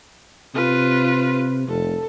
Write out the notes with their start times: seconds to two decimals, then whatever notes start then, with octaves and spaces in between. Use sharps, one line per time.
0.55 C3 F4 B4
1.68 F1 A4